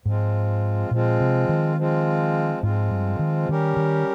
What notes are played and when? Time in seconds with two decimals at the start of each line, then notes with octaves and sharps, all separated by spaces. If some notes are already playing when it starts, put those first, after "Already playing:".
0.05 G#2 F3 G#3 C4 F4
0.91 A#2 F3 G#3 C4 F4
1.20 C3
1.49 D#3
1.76 F3 G#3 C4 F4
2.63 G#2 F3 G#3 C4 F4
2.91 G2
3.19 D#3
3.48 D#3 G3 C#4 G4 A#4
3.77 D#3